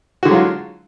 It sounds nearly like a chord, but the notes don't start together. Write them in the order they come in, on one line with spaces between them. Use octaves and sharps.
F#4 D3 G#3 F#3 F4